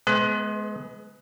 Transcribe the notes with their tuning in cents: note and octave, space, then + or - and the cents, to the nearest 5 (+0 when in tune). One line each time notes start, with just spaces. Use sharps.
G#3 +30 B3 +0 B4 +40